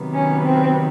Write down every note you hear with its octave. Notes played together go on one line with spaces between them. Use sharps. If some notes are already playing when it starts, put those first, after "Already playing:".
Already playing: C3 D#3 F#3 B3
C#4
C4